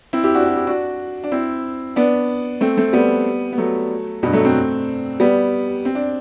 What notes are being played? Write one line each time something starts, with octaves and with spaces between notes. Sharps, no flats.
C4 E4
E4 G4
D4 F#4
D4 F#4
E4 G4
D4 F#4
D4
C4 E4
B3 D4
A3 C4
A3 C4
G3 B3
B3
F#3 A3
G2 B2
F#3 A3
A3 C4
G3 B3
C4
D4